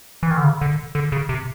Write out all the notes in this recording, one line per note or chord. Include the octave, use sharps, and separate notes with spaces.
E3
D#3
D3
C#3
D3
D3
C#3
C3